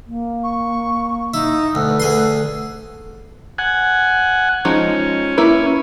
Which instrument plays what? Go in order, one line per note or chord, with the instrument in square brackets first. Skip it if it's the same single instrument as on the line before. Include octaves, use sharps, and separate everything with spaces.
[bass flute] A#3
[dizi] C#6
[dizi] D#4 [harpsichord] E4
[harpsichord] D2 [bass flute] A4
[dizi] B4
[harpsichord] D2 G#4 C6
[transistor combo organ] F#5 G#5
[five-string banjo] F3 G#3 D#4 [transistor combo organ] C#4
[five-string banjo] A#3 E4 B4